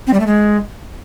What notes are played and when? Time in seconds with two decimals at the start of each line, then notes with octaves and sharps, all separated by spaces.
0.07 C4
0.13 G3
0.20 A3
0.27 G#3